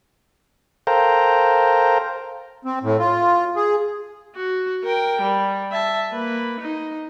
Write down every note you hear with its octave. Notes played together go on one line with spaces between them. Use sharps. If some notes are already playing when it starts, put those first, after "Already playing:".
A4 A#4 C5 F5 G5 A#5
C4
A2
F4
G#4
F#4
A#4 G5
G3
E5 A5
A#3 B4
D#4